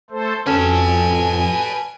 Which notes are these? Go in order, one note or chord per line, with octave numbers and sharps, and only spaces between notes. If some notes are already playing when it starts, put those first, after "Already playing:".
A3 A4 C5
F2 C#4 F#4 A4 B4 G#5 A5